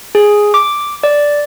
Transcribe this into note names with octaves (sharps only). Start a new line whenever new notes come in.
G#4
D6
D5